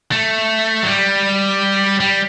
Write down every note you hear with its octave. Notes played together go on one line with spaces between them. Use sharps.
A3
F#3
G3
G3